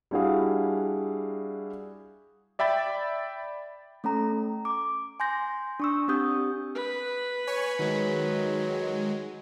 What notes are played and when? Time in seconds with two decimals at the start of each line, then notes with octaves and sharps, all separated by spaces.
0.11 G3 D4 E4 F#4 G#4 F5
2.59 D5 E5 G5 B5 A6
4.04 A3 C#4 A4 A#5
4.65 D6
5.20 G#5 C6 G6 A#6
5.80 D4 C#6 E6
6.08 C4 D4 G4 D#6 G6
6.75 B4
7.47 C#5 G#5 C#6
7.79 D#3 F#3 G#3